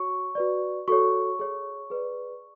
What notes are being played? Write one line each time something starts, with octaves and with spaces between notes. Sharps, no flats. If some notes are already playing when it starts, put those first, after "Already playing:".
Already playing: F#4 C#5 C#6
F#4 B4 D5
F#4 A4 C#5 C#6
G#4 C#5
G#4 B4 D5